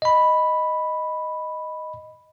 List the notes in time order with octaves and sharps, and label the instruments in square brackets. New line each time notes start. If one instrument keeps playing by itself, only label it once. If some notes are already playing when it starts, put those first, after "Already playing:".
[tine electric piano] D#5 B5